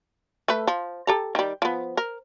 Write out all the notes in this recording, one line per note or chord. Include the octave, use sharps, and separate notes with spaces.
A3 A4 B4
F3
G4 A4 A#5
D#3 G3
F3 B3
A#4